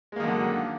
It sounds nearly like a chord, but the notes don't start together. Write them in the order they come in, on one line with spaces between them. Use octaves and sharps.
G#3 A#3 D#3 F#2 D3